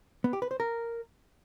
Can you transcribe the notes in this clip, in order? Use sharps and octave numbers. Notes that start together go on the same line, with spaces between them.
B3
G4
B4
C5
A#4